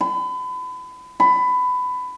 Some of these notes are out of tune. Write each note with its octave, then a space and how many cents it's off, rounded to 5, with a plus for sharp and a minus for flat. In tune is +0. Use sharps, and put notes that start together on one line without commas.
B5 +35
B5 +20